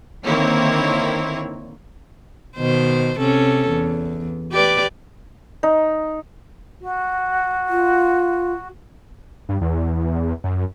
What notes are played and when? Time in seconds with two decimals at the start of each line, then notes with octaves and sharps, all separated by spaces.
0.24 D3 D#3 A#3 C4 E4 C#5
2.57 B2 D#3 C5
3.20 C3 C#4 A4
3.69 E2
4.52 G4 B4 D5
5.63 D#4
6.80 F#4
7.69 F4
9.49 G2
9.61 E2
10.44 F#2